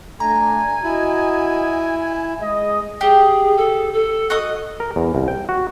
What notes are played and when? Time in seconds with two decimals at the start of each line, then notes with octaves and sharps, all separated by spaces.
0.20 A3 D4 G#5 A#5
0.84 E4 F#4 D#5
2.40 G#3 D#5
3.01 G4 G#4
3.56 A4
3.93 A4
4.30 F#4 D#5 D#6
4.80 A#4
4.96 E2
5.15 C2
5.28 G5
5.49 F#4